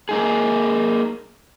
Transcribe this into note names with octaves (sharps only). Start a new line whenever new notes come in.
A#3 D#4 G#4